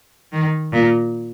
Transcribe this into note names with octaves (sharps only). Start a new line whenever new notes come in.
D#3
A#2